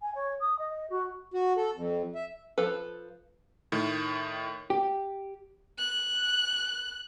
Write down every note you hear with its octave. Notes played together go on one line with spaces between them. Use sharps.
G#5
C#5
D#6
D#5
F#4
F#4
A4
F2
E5
F3 A4 B4
A2 D#3
G4
F#6